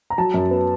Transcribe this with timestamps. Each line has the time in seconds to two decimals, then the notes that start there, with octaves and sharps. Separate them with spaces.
0.10 A#5
0.18 F#3 A5
0.34 F#2
0.51 B3